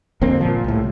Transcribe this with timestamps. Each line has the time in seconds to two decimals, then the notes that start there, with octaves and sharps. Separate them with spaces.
0.21 G1 F2 A#3 C4
0.41 A#2 F3
0.64 C2 A2